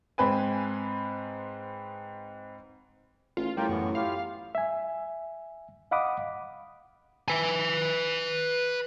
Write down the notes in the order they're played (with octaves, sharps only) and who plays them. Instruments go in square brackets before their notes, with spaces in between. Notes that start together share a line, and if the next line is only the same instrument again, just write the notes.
[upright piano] G#2 C4 B4 G#5
[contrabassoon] A1 [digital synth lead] F4
[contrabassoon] A2 [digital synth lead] G3 [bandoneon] F4 A#4 G5
[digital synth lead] F#2 [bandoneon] E3 B3 C#6
[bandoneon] E4 F4 G4 [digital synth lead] F5
[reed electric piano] E5 G#5
D#5 F5 F#5 B5 D6 D#6
[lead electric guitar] B4 G#5